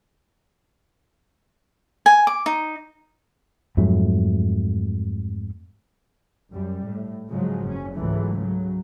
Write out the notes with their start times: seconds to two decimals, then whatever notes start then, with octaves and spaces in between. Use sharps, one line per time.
2.06 G#5
2.27 D6
2.46 D#4
3.77 F2 G#2 F#3 A3
6.52 F#2 G3
6.85 A2
7.29 G#2 C#3 F3 F#3 G#3
7.66 F#1 C#4
7.95 C#2 G#2 E3 F#3 A3
8.39 C#3 F#3